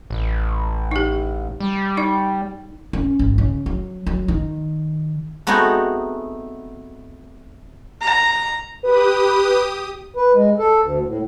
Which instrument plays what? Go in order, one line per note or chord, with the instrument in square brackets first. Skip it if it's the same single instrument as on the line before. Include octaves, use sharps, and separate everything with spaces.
[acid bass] A1
[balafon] D#4 G4
[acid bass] G3
[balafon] D#4 D5
[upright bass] C#4
G#1
C#3
F#3
F#3
D#3
[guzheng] A3 B3 C4 D#4 F#4 G#4
[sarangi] A#5
[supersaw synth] G4 D#6 [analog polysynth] B4
[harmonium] B4
G#3
A4
D2
A2